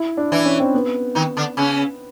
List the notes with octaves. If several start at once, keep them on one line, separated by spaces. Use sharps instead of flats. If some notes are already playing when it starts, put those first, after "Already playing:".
Already playing: E4
D4
E3 D4 E4
C#4
C4
B3
D#3 D#4
D3 D4
C#3 C#4